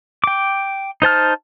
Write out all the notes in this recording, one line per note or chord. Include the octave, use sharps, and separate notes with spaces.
G5 D6
D#4 C5 A5 F6